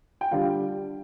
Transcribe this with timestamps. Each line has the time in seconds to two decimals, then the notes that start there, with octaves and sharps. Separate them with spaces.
0.21 G5
0.31 D3 G3 F4 F5